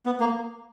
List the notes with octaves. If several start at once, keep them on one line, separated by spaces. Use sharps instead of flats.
B3
A#3